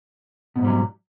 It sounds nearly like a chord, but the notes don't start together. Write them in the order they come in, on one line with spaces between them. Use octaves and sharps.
B2 F2 G#2 G3 F#3